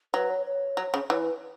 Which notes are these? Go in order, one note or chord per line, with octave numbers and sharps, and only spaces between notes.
F#3 B4
C#5
C#5
F#3
C#3
E3 C#5
B4